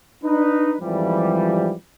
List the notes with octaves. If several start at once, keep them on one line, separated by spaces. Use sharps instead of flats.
D4 D#4 B4
F2 G#2 E3 F3 G3